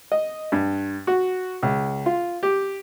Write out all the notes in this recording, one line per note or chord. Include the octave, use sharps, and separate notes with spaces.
D#5
G2
F#4
C#2
F4
G4